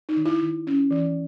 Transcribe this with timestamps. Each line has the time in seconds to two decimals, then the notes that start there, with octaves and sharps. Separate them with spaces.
0.09 D#4
0.17 D#3
0.26 E4
0.42 D#3
0.67 C#4
0.91 E3